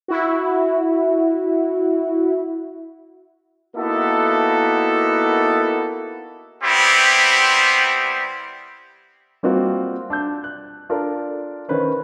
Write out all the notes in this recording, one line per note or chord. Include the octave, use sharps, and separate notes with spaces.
E4 F#4
A#3 B3 D#4 E4 F#4 A4
G3 B3 C4 E4 G4
G3 A#3 C4 D#4 F4 F#4
D4 E6 G6
F#6
D4 F4 A4 A#4 D5
D#3 C#4 B4 C5